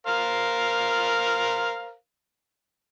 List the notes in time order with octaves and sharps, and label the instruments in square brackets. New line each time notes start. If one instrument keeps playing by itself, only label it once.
[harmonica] A#4 C5 F5